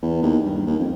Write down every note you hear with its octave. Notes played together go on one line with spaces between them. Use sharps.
E2
D#2
G2
D#2
F2